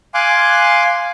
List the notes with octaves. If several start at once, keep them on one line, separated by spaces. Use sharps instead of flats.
F5 G#5 C6 D6 F#6